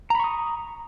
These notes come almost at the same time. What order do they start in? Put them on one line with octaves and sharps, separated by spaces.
A#5 B5 C#6 D#6